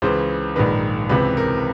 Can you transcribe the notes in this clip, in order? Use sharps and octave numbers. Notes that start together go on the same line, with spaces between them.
C#2 C#3 E3 C5
A#1 G#2 D#3 B4
C#2 C3 E3 B4
A#4